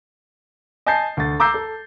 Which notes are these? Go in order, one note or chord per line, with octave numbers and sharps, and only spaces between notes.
D#5 G#5 A5 G6 A6 C7
D2 A6
A#5 D6 E6 G6 C7
A4